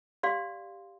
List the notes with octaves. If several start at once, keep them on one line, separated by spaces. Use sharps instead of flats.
G4 D5 F5 C6